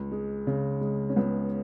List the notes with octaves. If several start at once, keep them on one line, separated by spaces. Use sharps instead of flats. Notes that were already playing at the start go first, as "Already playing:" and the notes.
Already playing: C#2
G#3
C#3
G#3
C#4
C#2 B3